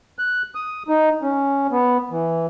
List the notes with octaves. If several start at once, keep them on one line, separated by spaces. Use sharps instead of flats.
F#6
D#6
D#4
C#4
B3
E3